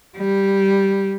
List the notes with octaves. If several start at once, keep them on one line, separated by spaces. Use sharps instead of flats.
G3